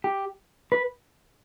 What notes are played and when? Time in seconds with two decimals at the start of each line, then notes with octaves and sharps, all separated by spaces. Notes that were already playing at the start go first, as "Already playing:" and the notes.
0.04 G4
0.72 B4